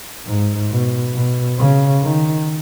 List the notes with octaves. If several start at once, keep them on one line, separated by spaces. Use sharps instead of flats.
G#2
B2
B2
C#3
D#3